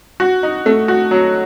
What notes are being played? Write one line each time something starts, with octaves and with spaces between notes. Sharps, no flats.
F#4
D#4
A3
F#4
F#3